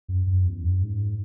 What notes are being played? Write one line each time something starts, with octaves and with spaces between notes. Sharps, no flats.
F#2
F#2
E2
F#2
G#2